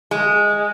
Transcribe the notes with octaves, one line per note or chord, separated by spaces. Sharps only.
G#3